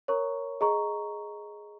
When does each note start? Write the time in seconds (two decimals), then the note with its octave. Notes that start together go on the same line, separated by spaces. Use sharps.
0.08 A#4 C#5 A#5 C#6
0.61 G#4 D#5 A#5 C#6